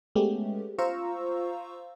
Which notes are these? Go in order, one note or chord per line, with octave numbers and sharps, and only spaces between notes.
G#3 A3 B3 C#4 G4
F4 C5 F5 A#5 C#6 E6